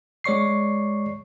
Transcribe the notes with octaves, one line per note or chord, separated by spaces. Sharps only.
G#3 C#5 D5 C#6 C7